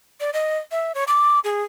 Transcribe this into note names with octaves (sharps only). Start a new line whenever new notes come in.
D5
D#5
E5
C#5
D6
G#4